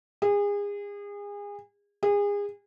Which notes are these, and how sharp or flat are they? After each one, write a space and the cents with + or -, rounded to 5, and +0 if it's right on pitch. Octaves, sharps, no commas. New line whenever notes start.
G#4 -30
G#4 -30